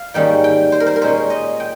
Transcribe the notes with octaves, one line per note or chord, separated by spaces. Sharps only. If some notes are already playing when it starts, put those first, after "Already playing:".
Already playing: F5
G#2 D#3 G3 A#3 C#4 G5
G5
C5
A#4
C5
A#4
A#2 G#3 C#4 C5
D#5
G5